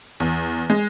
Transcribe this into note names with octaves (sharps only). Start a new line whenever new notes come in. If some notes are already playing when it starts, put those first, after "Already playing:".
E2
G#3